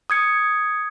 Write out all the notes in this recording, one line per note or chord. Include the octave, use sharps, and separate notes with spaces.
D#6 G#6 C#7